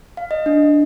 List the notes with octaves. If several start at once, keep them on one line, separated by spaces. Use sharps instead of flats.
F5
D#5
D4